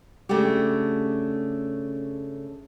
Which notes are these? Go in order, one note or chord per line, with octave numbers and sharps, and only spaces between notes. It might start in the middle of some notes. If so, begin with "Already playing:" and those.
C#3 A3 D4 F#4 G4